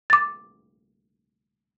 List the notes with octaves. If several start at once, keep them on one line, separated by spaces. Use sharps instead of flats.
D6 A6